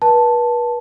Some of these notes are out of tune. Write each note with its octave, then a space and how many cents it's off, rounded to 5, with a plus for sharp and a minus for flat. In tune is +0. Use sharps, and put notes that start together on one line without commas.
B4 -40 A5 +0